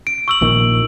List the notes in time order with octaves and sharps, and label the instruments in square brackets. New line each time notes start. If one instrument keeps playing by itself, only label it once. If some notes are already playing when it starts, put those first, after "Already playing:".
[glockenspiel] D7
C#6 E6 F#7
[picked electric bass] A#1 A#2 D#3